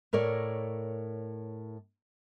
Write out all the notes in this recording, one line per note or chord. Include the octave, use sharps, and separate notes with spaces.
A2 A#4 C#5 D5